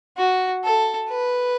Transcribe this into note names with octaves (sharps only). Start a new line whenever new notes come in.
F#4
A4
B4